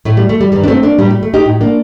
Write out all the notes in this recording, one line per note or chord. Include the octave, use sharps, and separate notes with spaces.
A2 A3
G3
A3
G3
G2 D#3 G3
D4
A3 C4
A#3 D4
A2 G3 A#3
G3
A3
D#4 G4
A2
A#3 D4